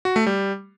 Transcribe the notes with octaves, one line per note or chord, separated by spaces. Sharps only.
F#4
A3
G3